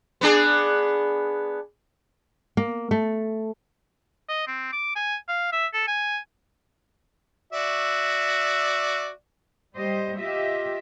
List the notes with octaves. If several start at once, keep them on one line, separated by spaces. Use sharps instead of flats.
B3 D4 G#4
A#3
A3
D#5
C4
D6
G#5
F5
E5
A4
G#5
F#4 D5 E5
G3 G4 C5 D#5
F4 G4 D#5 E5